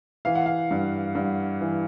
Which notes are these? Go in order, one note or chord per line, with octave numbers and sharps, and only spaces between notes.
E3 F5
F#5
F5
G2
G2
E3